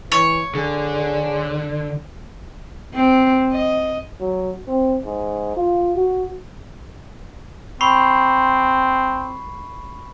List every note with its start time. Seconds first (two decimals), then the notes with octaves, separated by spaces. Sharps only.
0.12 E3 C#5
0.55 D3 G#4
2.94 C4
3.52 D#5
4.21 F#3
4.67 C4
5.05 G#2
5.56 F4
5.96 F#4
7.81 C4 B5 C#6 C7